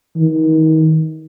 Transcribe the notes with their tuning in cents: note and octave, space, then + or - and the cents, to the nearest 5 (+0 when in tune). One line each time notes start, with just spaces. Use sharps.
D#3 +30